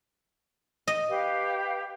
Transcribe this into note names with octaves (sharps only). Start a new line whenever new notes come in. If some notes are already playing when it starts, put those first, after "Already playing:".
D#5
G4 B4 F5